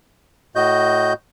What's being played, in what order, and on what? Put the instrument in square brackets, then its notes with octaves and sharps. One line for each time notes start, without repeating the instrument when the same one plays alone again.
[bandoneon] A2 F#4 D#5 G6